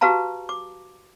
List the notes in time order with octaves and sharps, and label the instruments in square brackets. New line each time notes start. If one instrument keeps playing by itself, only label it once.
[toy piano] F#4 G4 B4 F5 A5 A#5
D6